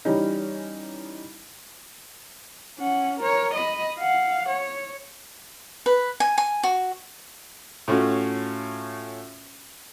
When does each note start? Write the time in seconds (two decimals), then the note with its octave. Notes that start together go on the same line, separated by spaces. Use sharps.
0.05 E3 G3 C#4 D#4
2.79 C#4 F#5
3.19 A#4 C#5
3.54 D#5 B5
3.99 F5 F#5
4.48 C#5
5.86 B4
6.20 G#5
6.38 G#5
6.63 F#4
7.88 A2 A3 C#4 F4 F#4